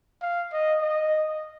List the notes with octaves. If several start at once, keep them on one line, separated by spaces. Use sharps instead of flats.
F5
D#5
D#5